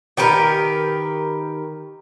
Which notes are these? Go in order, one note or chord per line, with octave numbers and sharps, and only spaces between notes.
D#3 G4 A#4 B4